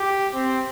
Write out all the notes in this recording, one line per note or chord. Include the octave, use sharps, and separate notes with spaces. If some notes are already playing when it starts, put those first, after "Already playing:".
Already playing: G4
C4